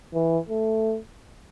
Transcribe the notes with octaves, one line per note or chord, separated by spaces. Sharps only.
E3
A3